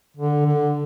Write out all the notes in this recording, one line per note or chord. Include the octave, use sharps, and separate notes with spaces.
D3
D3